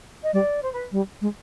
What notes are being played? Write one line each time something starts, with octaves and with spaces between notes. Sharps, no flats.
D#5
G3 D5
C5
B4
G3
G#3